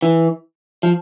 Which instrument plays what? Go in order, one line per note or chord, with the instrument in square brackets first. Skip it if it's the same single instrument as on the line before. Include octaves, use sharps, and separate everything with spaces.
[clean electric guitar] E3
F3